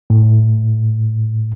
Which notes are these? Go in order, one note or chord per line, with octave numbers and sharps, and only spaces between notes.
A2